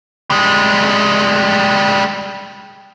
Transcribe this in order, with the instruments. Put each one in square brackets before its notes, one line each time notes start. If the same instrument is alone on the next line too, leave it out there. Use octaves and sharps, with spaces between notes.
[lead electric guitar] G3 G#3